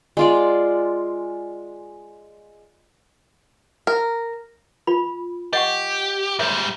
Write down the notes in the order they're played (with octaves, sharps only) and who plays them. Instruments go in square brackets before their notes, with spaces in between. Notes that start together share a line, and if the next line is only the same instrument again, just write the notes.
[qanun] G#3 F4 D5
[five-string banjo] A#4
[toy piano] F4 B5
[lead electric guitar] G4 [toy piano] D#5 F#5 C#6
[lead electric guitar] G#2 G3 [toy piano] C#5 E5